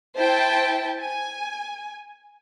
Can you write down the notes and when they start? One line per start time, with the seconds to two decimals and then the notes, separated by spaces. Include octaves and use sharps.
0.17 E4 C5 G5 A5
1.00 G#5